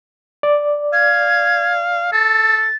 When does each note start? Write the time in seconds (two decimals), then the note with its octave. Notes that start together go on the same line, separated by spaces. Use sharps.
0.43 D5
0.93 F5 G#6
2.13 A4 A6